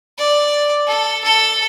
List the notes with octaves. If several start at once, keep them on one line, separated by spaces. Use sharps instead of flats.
D5
A4
A4